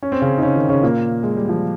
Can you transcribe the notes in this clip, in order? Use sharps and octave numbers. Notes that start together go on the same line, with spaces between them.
C#4
C4
C#3 C#4
D#4
C#3 C#4
D#3 D#4
C#3 C#4
A#2 A#3
G#3
G3
F3